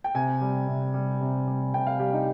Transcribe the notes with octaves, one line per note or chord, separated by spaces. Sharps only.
G5
C3 G#5
G3
C3
G3
C3
G3
C3 G5
F5
G3 G4
D#4